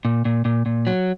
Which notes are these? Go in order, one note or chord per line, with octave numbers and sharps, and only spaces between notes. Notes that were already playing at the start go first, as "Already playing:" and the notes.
A#2
A#2
A#2
A#2
F#3